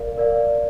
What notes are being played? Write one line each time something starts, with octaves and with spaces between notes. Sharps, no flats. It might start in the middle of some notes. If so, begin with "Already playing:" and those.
Already playing: A#4 D5 F5
A#4 D5 F5